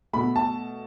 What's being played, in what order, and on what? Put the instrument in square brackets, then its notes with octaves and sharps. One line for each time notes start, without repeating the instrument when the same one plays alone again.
[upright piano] B2 A3 B5
A5